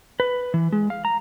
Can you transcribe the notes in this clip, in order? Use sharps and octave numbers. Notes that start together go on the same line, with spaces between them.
B4
E3
G#3
F5
A#5